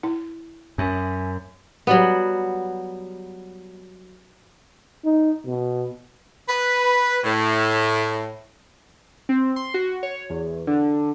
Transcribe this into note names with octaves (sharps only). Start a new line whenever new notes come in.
E4
F#2 C#4 E5 G#5
F#3 G3 B3
D#4
B2
B4
A2
C4
C6
F#4
C#5
E2
D3